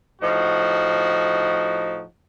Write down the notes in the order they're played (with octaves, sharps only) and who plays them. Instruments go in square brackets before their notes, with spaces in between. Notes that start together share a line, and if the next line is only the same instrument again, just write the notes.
[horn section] A2 F3 D#4 F#4